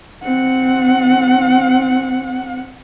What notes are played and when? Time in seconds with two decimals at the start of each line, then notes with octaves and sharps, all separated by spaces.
0.24 C4 F#5